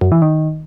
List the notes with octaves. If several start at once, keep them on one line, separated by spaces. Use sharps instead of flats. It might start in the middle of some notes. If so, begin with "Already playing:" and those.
F#2
E3
D#3